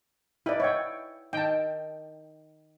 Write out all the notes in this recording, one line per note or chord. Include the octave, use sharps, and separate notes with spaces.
D#4 E4 B4 D5 G5
E4 C#5 F#5 G5
D#3 G5 A5